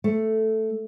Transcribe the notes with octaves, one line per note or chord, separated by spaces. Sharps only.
A3